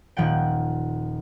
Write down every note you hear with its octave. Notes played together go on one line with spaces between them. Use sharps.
D#1 F3 F#5 G5